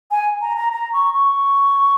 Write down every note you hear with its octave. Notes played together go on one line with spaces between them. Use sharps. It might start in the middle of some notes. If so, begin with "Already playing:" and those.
G#5
A#5
A#5
A#5
C#6
C#6